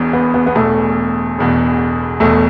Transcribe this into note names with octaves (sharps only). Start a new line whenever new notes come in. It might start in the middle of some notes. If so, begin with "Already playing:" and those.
Already playing: E1 E2 B2
B3
B3
B3
E1 E2 B2 A3
E1 E2 B2
E1 E2 B2 A3